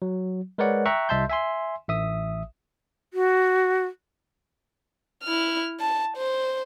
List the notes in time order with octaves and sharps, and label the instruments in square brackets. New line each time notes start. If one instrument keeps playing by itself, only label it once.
[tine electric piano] F#3
G#3 A#4 B4 C#5 D5 F#5
E5 G5 A#5 C#6 F#6
C2 D#5 E5 A5 C6 G6
E5 G#5 C6
A1 E5 D#6
[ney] F#4
[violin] E4 F6
A5
C5